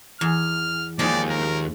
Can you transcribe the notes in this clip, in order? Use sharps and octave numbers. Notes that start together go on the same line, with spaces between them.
E2 F6
D#2 D#3 F3 G#3 D5
A#4